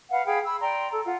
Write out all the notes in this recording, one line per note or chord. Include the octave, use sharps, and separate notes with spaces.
B4 F5 F#5
G#4 F5 G5 B5
B5 E6
D5 G5 A#5 C6
A4
F4 F#5